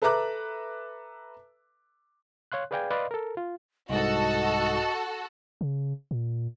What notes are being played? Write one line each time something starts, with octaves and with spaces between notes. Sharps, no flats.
A4 B4 E5 A#5 D6 F#6
C#5 F5 C6 F#6
G#4 B4 D5 F5 G5 G#5
B4 D5 D#5 F5 C6
A4 A#4
F4
C2 G#2 F#4 A4 D#5
C#3
A#2